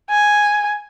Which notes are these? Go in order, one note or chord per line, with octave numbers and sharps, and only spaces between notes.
G#5